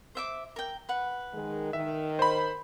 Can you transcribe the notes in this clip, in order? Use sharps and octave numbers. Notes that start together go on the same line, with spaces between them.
C5 E5 D6
A#4 G5
B4 F#5
D#3 G#3
D#3 E5
C5 B5